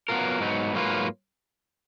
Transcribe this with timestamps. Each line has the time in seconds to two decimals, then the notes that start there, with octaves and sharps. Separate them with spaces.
0.09 F#3 B3 F4 A#4
0.40 G#2 F#3 B3 D#4
0.74 G#2 F#3 A#3 F4 B4